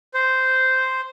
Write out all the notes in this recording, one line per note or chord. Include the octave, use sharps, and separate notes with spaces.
C5